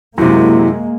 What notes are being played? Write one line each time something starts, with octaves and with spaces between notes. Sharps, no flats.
F#2 C3 G#3 A#3 E4